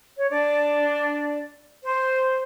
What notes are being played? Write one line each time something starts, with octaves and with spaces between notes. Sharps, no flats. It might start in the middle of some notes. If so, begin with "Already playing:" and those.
C#5
D4 D5
C5